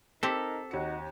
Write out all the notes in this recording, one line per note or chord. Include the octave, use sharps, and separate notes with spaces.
C4 D#4 G4 A4 A#4 B6
D#2 D#4 F#4 C#7